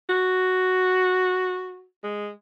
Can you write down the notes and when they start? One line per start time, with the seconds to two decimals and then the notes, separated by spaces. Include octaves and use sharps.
0.09 F#4
2.03 G#3